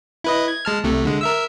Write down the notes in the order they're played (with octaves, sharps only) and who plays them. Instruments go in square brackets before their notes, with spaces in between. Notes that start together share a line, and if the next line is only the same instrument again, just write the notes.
[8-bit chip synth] E4 B4 D#5
G#6
G#3 A5 F6
C2 C3 A3
D3 G#3
A#4 E5 E6